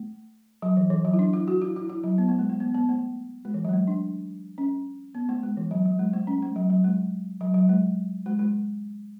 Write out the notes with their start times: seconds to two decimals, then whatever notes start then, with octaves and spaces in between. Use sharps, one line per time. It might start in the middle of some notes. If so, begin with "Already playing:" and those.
Already playing: A3
0.62 F#3
0.77 E3
0.90 E3
1.05 F#3
1.13 E4
1.19 D4
1.33 E4
1.48 F#4
1.62 E4
1.76 E4
1.89 E4
2.04 F#3
2.18 B3
2.29 A3
2.39 G#3
2.49 A3
2.60 B3
2.75 B3
2.89 A3
3.45 G#3
3.54 E3
3.65 F#3
3.69 G#3
3.73 A3
3.87 D4
4.58 C#4
5.15 B3
5.29 A3
5.43 G#3
5.57 E3
5.71 F#3
5.85 F#3
5.99 G#3
6.13 A3
6.27 C#4
6.42 A3
6.56 F#3
6.70 F#3
6.84 G#3
7.41 F#3
7.54 F#3
7.69 G#3
8.26 G#3
8.39 G#3